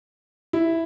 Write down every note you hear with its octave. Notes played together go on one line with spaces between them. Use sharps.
E4